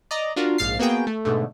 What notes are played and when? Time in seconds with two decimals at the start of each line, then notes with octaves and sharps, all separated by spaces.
0.11 D5 D#5 A#5
0.36 D4 F4 F#4 A#4
0.58 A#1 G#2 F5 A6 C7
0.79 A#3 B3 F#4 G#4 G5
1.07 A3
1.25 G#2 B2 D3 A3